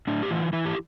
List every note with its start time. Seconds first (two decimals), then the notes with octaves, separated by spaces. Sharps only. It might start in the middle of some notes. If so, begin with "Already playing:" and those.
0.07 A2 D4
0.23 G4
0.30 E3 F4
0.53 E3 E4
0.65 G4